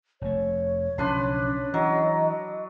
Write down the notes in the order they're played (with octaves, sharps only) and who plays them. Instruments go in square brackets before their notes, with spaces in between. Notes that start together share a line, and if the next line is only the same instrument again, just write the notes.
[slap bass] F1 A3 [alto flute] C#5
[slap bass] B1 C#3 F3 [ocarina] C#4 [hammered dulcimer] D4 B4 C6
[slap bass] E3 [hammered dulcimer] F#3 [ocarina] D#5